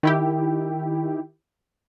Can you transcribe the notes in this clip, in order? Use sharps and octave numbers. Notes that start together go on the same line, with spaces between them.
D#3 E4 G4